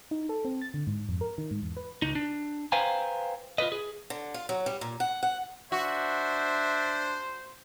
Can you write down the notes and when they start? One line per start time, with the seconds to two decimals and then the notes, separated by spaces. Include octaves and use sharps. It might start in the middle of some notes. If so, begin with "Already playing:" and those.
0.11 D#4
0.29 A4
0.45 C4
0.61 A6
0.74 D3
0.87 G#2
1.09 F2
1.21 A#4
1.38 D#3
1.51 G#2
1.62 E2
1.77 B4
2.02 C#2 D#4
2.15 D4
2.72 B4 C5 F5 G5 G#5 A#5
3.58 F4 A4 B4 D#5
3.72 G#4
4.10 D3
4.34 F4
4.49 F#3
4.66 G3
4.81 A#2
5.00 F#5
5.23 F#5
5.72 D4 F#4 C5 E5